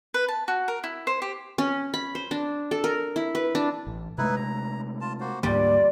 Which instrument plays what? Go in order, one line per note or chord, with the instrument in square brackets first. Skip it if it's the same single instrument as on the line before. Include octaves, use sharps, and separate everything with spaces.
[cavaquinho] B4
A5
F#4
A#4
E4
C5
G4
[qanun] C#4
B5
C5
D4
A4
A#4
E4
B4
D4
[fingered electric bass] A1
[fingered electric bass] C3 G#3 A3 [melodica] D#4 E4 B4
[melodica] A#5
F4 A5
A#3 F#4 C5
[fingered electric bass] D2 G#2 A#3 [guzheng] G3 [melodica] F4 [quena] D5